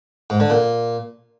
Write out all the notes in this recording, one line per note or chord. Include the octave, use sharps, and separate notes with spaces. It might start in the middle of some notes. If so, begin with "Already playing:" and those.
G#2
D3
A#2